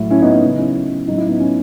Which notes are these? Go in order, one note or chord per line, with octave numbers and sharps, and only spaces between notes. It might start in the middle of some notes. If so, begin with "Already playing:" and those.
Already playing: A2 F#3
C#4 E4
B3 D#4
C#4
C#3 F#3
C#4 E4
A2 F#3 D#4
E4
B3 D#4
C#4